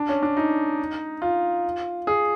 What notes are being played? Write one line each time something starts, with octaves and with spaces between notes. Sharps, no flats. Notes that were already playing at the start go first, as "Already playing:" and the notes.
Already playing: D4
C#4
D4
D#4
F4
G#4